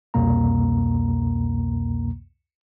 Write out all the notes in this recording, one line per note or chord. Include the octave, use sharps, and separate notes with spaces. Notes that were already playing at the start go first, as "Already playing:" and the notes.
C2 F2 B2 A#3 A#5